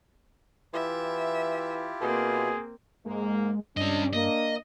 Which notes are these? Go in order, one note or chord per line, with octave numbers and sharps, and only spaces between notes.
E3 E4 F4 G4 E5
B2 A#3 C4 G#4
G#2 G#3 A#3
G2 C#4 D4 D#5
A#3 D#5